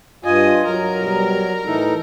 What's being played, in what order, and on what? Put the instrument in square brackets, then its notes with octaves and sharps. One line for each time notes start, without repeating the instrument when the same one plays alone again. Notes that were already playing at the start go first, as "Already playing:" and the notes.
[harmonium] G2 G#5 [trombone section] F4 [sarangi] D#5
[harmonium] F#3 [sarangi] A#4
[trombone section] B2 G3
[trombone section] A2 E3 [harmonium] D#4 A4